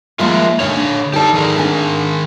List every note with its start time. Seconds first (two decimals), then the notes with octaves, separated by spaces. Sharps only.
0.19 F3 G#3 A#3 F4 A#4 E5
0.60 A#2 D3 D#3 C#5
0.77 D4
1.13 D#4 G4 A4 D5 A5
1.34 D#3 G#4 A#4
1.56 D4 G#5